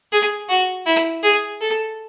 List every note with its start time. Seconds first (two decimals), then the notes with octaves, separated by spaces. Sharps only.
0.12 G#4
0.49 F#4
0.86 E4
1.23 G#4
1.61 A4